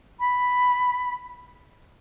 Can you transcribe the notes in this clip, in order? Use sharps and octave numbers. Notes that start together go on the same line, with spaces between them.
B5